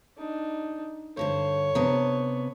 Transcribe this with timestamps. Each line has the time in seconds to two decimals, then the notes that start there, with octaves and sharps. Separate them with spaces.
0.17 D4 D#4
1.17 G2 D3 C5 C#5
1.75 C3 B3 D4